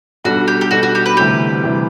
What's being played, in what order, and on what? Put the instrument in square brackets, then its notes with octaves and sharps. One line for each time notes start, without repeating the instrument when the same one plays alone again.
[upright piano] B1 B2 G3 D4 A4 [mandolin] F#4
[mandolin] G4
G4
[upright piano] B1 B2 G3 D4 A4 [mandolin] F#4
[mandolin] F#4
G4
B4
[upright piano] D2 C3 E3 G3 [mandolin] G4
[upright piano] D2 C3 E3 G3